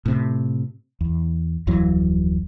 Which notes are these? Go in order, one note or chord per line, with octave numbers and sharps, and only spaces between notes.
A2 C3
E2
D1 F2 E3 F#3